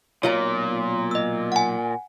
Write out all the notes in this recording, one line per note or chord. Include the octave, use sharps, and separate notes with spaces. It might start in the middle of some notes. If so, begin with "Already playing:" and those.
B1 A#2 F4 C#5 A#5
D#5 E6
F#5 G#5